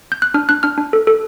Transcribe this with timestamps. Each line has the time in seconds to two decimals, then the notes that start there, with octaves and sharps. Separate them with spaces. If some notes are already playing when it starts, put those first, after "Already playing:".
0.12 G6
0.22 F#6
0.34 D4 F6
0.49 D4 F#6
0.63 D4 F6
0.78 D4
0.93 A4
1.07 A4